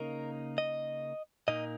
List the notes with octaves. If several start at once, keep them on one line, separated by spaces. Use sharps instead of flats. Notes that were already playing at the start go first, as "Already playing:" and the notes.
Already playing: C#3 A#3 D#4 A#4
D#5
A#2 A#3 D#4 D#5